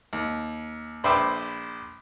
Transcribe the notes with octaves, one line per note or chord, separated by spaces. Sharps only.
D#2
A#1 B4 C5 E5 G5 D6